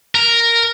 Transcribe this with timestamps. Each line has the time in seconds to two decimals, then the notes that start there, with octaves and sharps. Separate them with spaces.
0.15 A#4